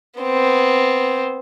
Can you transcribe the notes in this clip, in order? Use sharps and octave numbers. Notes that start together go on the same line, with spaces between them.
B3 C4